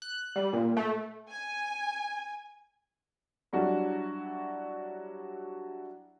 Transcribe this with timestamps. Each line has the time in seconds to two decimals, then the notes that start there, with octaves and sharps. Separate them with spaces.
0.02 F#6
0.36 G3
0.53 A#2
0.77 A3
1.29 G#5
3.53 F#3 G3 D4 E4 F#4